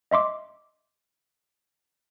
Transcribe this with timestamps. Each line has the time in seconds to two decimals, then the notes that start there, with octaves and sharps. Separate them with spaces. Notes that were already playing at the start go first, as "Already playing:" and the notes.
0.11 D#5 E5 C6 D6